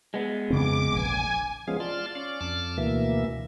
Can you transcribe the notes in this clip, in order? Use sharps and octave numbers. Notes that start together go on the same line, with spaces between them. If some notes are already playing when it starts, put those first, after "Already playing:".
G#3 B3
F2 C#3 C4 D6
F1 A#1 D3 G#5
F3 G#3 B3 C#4 G#4 F5
F4 D5 A5 C6 F6
C#4 D5 F5
F2 A5 D6 F6
D2 B2 E3 A#3 E5